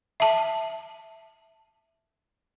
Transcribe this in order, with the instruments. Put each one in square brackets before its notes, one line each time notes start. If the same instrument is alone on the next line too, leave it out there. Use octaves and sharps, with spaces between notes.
[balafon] E5 A5